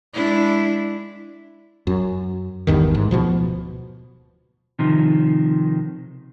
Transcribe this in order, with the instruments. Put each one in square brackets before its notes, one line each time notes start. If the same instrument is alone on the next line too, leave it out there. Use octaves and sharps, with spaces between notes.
[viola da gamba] G#3 D4 E4
[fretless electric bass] F#2
A1 E2 G2 D#3
G#2
D1 G#1 B2 F3
[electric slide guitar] C3 D#3 F3